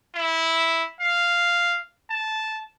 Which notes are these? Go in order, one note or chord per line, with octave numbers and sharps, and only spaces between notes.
E4
F5
A5